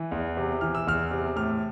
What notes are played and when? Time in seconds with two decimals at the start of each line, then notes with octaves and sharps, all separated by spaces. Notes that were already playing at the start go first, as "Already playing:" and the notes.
Already playing: E3
0.12 E2
0.37 C3
0.61 E3 F6
0.75 E6
0.87 E2 F6
1.11 C3
1.36 A2 F6